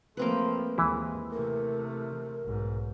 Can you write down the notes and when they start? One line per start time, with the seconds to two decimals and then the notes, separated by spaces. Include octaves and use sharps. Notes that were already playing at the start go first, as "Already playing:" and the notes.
0.17 F3 A3 A#3 C4 B4
0.78 D#2 E3 G#3 E4
1.31 C3 A3 A#4
2.43 B1 G#2